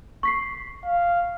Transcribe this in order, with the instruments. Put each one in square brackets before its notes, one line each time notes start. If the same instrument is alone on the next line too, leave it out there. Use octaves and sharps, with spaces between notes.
[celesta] C#6 B6 C7
[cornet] F5